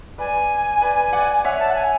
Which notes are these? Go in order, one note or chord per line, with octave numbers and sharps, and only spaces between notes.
B4 D5 G#5
B4 D5
D5 F#5
G#5
C#5 E5 F#5
A5
F#5
G#5